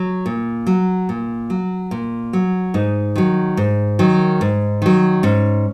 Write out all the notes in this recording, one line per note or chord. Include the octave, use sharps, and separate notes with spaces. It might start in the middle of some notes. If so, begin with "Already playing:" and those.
Already playing: F#3
A#2
F#3
A#2
F#3
A#2
F#3
G#2 D#4
D#3 F#3
G#2
D#3 F#3
G#2
D#3 F#3
G#2 C#4